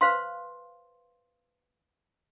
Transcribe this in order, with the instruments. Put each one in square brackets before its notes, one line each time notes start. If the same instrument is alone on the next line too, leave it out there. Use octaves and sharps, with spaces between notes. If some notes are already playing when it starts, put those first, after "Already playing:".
[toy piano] B4 C5 F5 C6